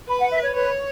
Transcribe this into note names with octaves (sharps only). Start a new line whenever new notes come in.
B4 B5
F#5
E5
C#5
B4 C#5